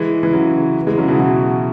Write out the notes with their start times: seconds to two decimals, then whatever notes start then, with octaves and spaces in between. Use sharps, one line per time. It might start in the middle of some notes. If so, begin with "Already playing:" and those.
Already playing: E3 G#3
0.23 E3
0.33 C#3 F#3
0.87 E3 G#3
0.98 C#3 F#3
1.08 B2 E3
1.19 B2 E3